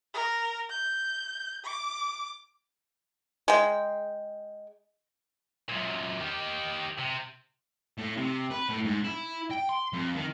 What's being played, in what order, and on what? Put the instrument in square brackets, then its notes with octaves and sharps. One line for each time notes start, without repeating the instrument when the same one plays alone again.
[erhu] A#4
G6
D6
[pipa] G#3 G5
[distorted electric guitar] F#2 A#2
D#3 G4
C3
A2
C3
B4
A2
G#2
E4
G5
C6
F2
D#3